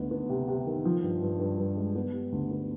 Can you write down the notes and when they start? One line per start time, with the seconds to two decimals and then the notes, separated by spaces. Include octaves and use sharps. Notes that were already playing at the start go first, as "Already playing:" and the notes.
Already playing: D2 B3 D#4
0.11 B3
0.29 C3
0.48 C3
0.66 D#3
0.85 F3
1.03 G2
1.22 G2
1.40 G2
1.58 G2
1.77 G#3
1.95 B3
2.13 G3
2.32 D2
2.51 B3